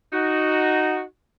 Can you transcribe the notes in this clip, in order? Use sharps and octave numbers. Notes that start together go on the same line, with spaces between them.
D#4 F#4